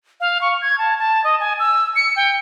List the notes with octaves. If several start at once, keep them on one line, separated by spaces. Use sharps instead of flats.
F5
C#6
G#6
A5
A5
D#5
G#5
E6
C#7
G5